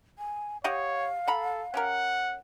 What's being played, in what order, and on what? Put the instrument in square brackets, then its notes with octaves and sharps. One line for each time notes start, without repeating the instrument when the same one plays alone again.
[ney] G#5
[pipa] G4 D#5 F#5 [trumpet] C#5 [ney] F5
[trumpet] A4 [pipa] F#5 A#5 B5
[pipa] C#4 G4 A#4 [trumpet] F#5